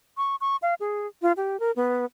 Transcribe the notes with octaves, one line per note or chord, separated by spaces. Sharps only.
C#6
C#6
F5
G#4
F4
G4
A#4
B3